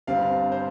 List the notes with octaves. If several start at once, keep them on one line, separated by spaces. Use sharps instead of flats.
G1 G2 G3 C4 F5
C5